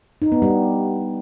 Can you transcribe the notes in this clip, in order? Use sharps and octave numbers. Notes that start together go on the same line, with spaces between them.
D#4
B3
G3